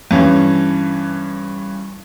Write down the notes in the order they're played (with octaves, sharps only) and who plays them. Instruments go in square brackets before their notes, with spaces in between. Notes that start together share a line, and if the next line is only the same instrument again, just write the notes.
[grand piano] G2 E3 C#4